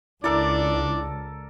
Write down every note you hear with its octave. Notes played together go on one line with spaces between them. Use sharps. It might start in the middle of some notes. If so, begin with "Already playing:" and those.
C#2 D4 E4 A4 A#4 D5 D6